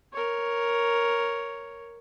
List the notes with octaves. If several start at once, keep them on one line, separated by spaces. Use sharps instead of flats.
A#4 C#5